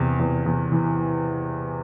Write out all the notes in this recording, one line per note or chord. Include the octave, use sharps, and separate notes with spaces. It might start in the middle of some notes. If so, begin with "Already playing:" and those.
Already playing: E2 C3
E2
E2
E3